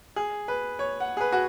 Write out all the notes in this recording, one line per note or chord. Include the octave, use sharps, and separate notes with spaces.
G#4
B4
C#5
F#5
G#4
B4
F#4